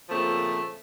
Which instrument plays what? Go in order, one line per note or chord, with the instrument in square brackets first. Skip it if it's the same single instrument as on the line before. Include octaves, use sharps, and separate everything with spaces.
[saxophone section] A#2 C#3 F3 A3 C4